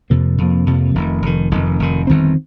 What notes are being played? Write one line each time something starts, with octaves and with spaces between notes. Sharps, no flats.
F2 C3 F3 A#3
F2 C3 F3 A#3
F2 C3 F3 A#3
F1 F2 D#3
F1 F2 D#3
F1 F2 D#3
F1 F2 D#3
G1 F2 D#3 C4